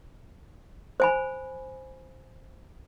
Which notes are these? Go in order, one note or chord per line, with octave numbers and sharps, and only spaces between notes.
C5 G#5 B5